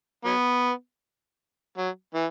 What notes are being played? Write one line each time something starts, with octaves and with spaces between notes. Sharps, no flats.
F#3 B3
F#3
E3